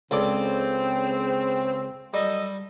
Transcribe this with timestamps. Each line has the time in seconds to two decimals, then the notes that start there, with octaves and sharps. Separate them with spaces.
0.11 C#2 C#3 C4 A4 D5
2.14 F#3 G3 A4 D#5